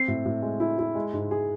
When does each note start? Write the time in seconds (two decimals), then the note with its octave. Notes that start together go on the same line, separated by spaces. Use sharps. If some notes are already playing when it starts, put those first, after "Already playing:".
Already playing: C4 C7
0.08 A2
0.25 A2
0.42 G#3
0.60 E4
0.79 E4
0.95 G#3
1.13 G#2
1.31 G#4